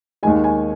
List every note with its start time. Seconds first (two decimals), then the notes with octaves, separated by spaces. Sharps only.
0.23 D#2 D#3 G#3 G#5
0.44 G#5